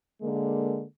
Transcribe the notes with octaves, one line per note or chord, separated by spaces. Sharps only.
D3 G#3 A#3